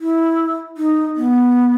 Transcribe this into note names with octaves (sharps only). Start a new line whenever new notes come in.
E4
D#4
B3